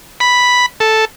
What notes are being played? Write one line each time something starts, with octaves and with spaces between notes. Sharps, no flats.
B5
A4